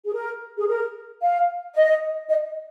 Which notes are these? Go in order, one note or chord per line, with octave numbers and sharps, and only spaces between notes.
G#4
A#4
G#4
A#4
F5
D#5
D#5